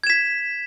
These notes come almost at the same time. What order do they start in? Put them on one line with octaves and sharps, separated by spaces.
G#6 E7 B6